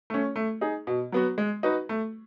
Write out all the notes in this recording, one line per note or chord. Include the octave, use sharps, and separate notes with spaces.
A3 C#4
A3
D#4 G#4
B2
F#3 B3 F#4
G#3
D#4 F#4 B4
A3